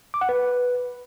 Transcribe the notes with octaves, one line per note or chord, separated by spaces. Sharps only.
D6
F#5
B4